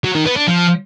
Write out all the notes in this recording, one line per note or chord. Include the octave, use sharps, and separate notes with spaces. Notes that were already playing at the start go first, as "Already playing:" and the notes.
F#3
D#3
B3
D4
F3